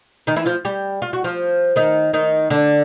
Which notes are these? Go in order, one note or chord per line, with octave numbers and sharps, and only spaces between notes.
D#3 D#4
E3 E4
F3 F4
G3 G4
F4
F#4
F3 F4
D#3 D#4
D#3 D#4
D3 D4